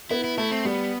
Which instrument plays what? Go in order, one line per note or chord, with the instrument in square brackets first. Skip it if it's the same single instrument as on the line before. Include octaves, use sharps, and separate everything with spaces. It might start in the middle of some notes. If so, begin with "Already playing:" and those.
[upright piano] B3 [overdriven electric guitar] E4
[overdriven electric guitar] E4
[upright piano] A3 [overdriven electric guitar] E4
[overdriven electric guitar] C4
[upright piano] G3 [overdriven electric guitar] B3